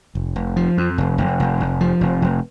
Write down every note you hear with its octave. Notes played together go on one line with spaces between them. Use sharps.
F1
F1
F3
F2
F1
F1
F1
F1
F3
F1
F1